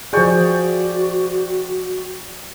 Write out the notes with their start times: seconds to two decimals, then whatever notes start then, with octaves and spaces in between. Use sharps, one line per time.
0.13 F3 F#4 G#4 D5 G5 C#6